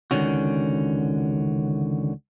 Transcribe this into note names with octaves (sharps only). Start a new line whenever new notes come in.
C#2 A#2 D3 D#3 C#4 F#4